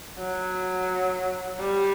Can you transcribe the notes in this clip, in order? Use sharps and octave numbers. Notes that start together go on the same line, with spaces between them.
F#3
G3